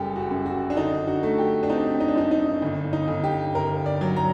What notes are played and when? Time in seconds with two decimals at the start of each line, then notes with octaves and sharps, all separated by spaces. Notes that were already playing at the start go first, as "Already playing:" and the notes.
Already playing: F#1 F#2 G3 G4 A4
0.16 F#4
0.31 F#2
0.46 F#4
0.70 D4
0.76 D3 D#4
1.07 F#4
1.23 A3
1.38 G4
1.63 D4
1.70 C4 D#4
2.00 D#4
2.08 D4
2.16 F#2 D#4
2.31 D#4
2.62 G1
2.93 D#4
3.08 G1
3.24 G4
3.55 G1 A#4
3.86 D5
4.01 F#3
4.16 A#5